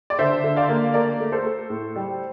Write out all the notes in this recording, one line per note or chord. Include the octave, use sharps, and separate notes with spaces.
D5
D3 C5 E5
D3
D5 F5
A#3
A3 A#4 D5
A3
A4 C5
A3
A2
G3